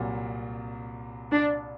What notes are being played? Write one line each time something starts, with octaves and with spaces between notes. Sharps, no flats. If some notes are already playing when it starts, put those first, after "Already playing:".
Already playing: C2 A#2 F#3 A#3
D4